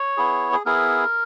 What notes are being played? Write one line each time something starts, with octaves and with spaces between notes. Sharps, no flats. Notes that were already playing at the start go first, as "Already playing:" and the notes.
Already playing: C#5
B3 E4 G#4
G#4
B3 E4 G#4 A#4